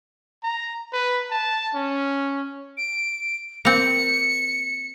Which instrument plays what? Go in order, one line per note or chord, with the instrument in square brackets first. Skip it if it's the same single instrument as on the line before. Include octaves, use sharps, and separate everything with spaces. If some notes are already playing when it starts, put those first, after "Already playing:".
[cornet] A#5
B4
A5
C#4
[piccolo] D7
[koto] A#3 C4 [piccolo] C#7